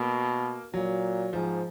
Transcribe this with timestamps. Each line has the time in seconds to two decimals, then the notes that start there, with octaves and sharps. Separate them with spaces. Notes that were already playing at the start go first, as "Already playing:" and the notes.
Already playing: B2 A#3
0.73 A#2 F#3
1.33 G#2 F3